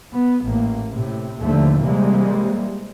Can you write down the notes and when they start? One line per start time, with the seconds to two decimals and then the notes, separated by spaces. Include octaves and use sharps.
0.13 B3
0.46 A1 A#3
0.91 A2 C3
1.40 D#2 A#2 D3 F3 A3
1.84 C3 E3 G3 G#3 A#3